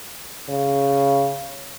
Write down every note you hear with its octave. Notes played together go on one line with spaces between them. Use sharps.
C#3